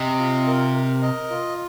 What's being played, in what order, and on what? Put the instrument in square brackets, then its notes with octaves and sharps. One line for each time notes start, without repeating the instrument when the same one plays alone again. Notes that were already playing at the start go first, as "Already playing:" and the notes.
Already playing: [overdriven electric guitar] C3 [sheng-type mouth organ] D#5
[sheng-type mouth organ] F4
A#4
A#4
D#5
F4